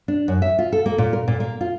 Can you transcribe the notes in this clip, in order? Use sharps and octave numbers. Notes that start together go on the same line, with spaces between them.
D4
F#2
E5
F4
A4
A#3
A#2
A#4
A#2
A#3
F4